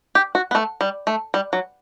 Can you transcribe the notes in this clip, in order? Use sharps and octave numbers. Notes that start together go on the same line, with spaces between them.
G4
F#4
B3
A3
G3
A3
G3
F#3